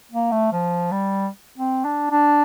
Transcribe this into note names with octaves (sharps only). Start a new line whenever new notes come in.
A#3
A3
F3
G3
C4
D4
D4